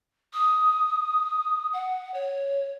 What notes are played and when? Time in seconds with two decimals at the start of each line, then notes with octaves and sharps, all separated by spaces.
0.33 D#6
1.73 F#5
2.14 C#5